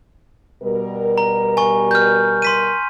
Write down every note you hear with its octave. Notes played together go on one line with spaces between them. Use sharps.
B2 G3 A#4
A#5
G#5 C#6
F6 G6
C6 B6 D#7